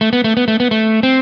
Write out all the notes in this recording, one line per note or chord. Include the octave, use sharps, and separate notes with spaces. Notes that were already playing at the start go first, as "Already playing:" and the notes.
A3
B3
A3
B3
A3
B3
A3
C4